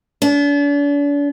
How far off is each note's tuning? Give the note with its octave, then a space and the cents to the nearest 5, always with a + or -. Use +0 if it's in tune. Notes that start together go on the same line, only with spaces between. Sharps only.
D4 -40